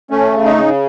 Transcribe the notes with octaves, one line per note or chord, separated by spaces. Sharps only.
A3 C#4
C#3
D#4
C#3